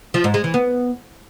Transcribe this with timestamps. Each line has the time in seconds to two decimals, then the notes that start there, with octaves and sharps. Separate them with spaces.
0.14 F3
0.24 G#2
0.34 G#3
0.44 E3
0.54 B3